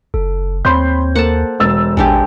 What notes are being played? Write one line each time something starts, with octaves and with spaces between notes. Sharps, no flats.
F#1 A4
D#2 C4 C5 C#5 B5 C6 G6
A#3 A4 C5 F#5 A5
E1 E6 A6
A1 G#3 D4 G4